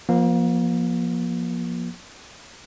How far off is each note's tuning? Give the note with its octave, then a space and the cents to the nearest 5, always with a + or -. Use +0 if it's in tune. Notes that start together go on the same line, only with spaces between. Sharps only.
F3 +0 A#3 +35